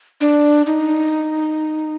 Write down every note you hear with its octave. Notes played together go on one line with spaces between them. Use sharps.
D4
D#4